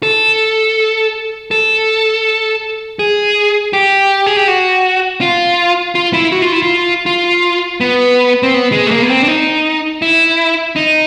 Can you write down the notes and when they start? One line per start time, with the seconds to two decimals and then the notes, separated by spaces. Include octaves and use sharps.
0.03 A4
1.51 A4
2.99 G#4
3.73 G4
4.26 G#4
4.37 G4
4.48 F#4
5.21 F4
5.95 F4
6.13 E4
6.32 F#4
6.42 F4
6.52 E4
6.62 F4
7.06 F4
7.80 B3
8.43 C4
8.54 B3
8.72 G#3
8.87 A3
8.91 A#3
9.02 B3
9.09 C4
9.23 D4
9.28 D#4
10.02 E4
10.76 D#4